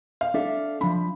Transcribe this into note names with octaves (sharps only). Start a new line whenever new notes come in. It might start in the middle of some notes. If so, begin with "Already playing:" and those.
F5
D4 A4 E5
F3 D4 B5